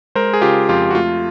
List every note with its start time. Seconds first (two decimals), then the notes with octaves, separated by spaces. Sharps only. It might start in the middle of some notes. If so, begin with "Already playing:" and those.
0.15 G#3 A#4 C5
0.33 G#4
0.42 C#3 F4 G4
0.69 F2 F4 G4
0.91 F#4
0.95 A3 F4